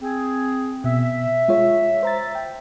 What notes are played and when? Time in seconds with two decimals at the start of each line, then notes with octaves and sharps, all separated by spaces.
0.02 C4 G#4
0.84 B2 E5
1.48 G#3 F4 C#5
2.03 C5 A#5 A6
2.35 G5